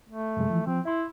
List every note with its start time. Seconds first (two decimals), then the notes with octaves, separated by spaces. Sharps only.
0.09 A3
0.37 F#2 C3 G#3
0.50 E3 F3
0.67 F3 C4
0.85 E4 E5 C6